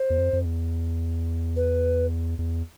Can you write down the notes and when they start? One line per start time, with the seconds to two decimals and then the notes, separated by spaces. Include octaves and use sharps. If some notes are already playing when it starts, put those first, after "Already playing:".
Already playing: C5
0.10 E2
0.17 F2
0.33 F2
0.45 E2
1.56 B4
2.39 E2